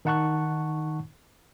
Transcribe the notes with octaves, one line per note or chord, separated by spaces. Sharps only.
D#3 D#4 F#5 A5 C#6 F#6